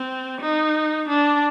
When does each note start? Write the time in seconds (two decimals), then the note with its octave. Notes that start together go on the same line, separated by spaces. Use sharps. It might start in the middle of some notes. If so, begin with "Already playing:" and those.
Already playing: C4
0.41 D#4
1.09 D4